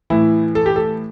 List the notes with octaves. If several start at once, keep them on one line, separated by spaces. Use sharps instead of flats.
A2 E3 E4
A4
G4
A4